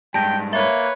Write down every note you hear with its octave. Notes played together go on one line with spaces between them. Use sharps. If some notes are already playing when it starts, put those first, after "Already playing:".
G#2 G3 G5 A5 A#6
A#3 B4 C#5 E5